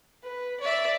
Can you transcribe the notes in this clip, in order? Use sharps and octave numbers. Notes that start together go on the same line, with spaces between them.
B4
D5 E5